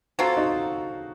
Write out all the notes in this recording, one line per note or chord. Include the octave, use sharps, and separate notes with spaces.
F#3 C4 F4 F#4 A4
D#4 F#4